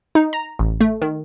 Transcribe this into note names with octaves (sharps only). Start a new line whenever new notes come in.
D#4
A#5
A1
A3
D#3